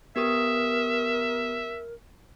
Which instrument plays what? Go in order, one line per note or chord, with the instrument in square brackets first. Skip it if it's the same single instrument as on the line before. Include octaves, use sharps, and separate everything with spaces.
[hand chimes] B3 G4 D#6 [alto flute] A#4 [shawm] E5